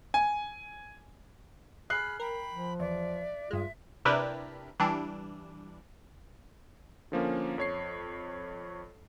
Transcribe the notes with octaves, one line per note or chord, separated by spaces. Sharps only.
G#5
G#4 B5 F6 F#6 C7
A#4 G5 B5
F3
E2 D5 E5
G2 G#3 F4 E5
C3 D4 E4 G4 A#4 B4
E3 G3 D4
D3 F3 A#3 C#4
F2 C#5 C7